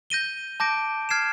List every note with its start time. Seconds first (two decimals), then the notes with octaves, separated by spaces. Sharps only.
0.10 G6 A#6 D#7 G7
0.60 A5 D6 G6 A#6 D7
1.09 F6 G#6 C7 E7